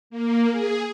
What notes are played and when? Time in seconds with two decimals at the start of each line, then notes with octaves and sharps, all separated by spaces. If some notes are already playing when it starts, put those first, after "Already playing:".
0.10 A#3
0.50 G#4